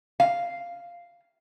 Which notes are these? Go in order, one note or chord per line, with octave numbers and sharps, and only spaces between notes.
F5